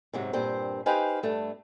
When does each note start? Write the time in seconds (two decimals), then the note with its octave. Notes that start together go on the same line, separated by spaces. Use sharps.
0.13 G#2 C3 F#3
0.33 G2 A#2 C4 C5
0.86 D#4 G4 B4 C5 F5 G#5
1.23 G2 A3 D4